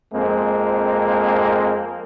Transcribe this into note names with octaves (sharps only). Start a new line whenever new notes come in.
F2 G#3 A#3 C4